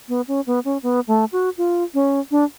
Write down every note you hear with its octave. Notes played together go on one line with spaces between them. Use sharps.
B3
C#4
B3
C#4
B3
A3
F#4
F4
C#4
D4